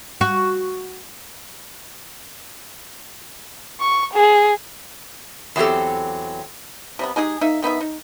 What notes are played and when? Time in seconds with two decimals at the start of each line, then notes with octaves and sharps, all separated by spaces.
0.21 F#4
3.81 C#6
4.14 G#4
5.56 E2 F#3 C4 G4 A4
6.99 C3 G3 B3
7.16 G#3 D#4 G4 G#4
7.41 A#3 D#4 E5
7.62 D#3 B3 D#4 E5
7.81 D#4